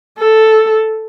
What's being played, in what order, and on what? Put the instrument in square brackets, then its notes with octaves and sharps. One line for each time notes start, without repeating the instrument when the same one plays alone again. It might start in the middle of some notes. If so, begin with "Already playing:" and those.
[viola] A4